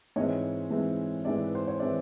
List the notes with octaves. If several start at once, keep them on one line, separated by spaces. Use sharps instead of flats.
G#2 E3 G#3 C4 C#5 D#5
G#2 E3 G#3 C4
G#2 E3 G#3 C4 D5 E5
B4
C5
C#5
E3 G#3 C4 C5 D5